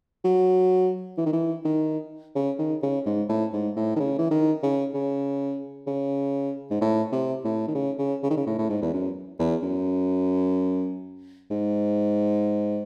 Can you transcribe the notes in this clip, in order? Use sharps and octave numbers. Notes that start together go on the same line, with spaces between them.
F#3
E3
D#3
E3
D#3
C#3
D#3
C#3
G#2
A2
G#2
A2
D#3
C#3
E3
D#3
C#3
C#3
C#3
G#2
A2
C3
A2
D#3
C#3
C#3
C#3
D#3
C#3
A2
A2
G#2
E2
F#2
E2
F#2
G#2